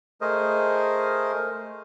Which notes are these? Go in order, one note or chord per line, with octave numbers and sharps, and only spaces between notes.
A3 G#4 A#4 C5 D#5